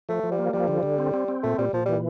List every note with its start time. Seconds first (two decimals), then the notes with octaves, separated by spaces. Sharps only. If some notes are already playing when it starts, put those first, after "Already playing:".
0.09 F3 A3
0.23 F3
0.31 G3
0.38 A#3
0.53 F3 G3
0.68 D3
0.83 D3
0.98 C4
1.14 C4
1.28 C4
1.43 A#2 A3
1.58 A#2 G3
1.73 A#2 F3
1.85 E3 G3